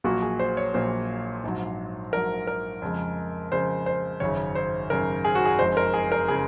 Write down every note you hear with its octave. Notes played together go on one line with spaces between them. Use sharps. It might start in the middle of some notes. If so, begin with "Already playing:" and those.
A#1 A#2 F#3 A#3 F#4
G#4
C5
C#5
A#1 A#2 F#3 A#3 C5
A#1 G#2 F#3
A#1 G#2 F#3 A#4
A#4
F2 C#3 G#3
F2 C#3 G#3 C5
C5
G#1 F#2 C#3 C#5
C5
G#1 F#2 C#3 A#4
G#4
F#4
G#4
F#1 F2 C#3 G#3 C5
A#4
G#4
A#4
C#3 G#3 G#4